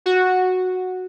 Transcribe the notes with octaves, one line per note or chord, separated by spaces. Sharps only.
F#4